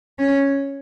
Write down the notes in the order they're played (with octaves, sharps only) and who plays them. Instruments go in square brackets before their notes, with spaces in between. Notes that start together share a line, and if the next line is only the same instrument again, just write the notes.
[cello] C#4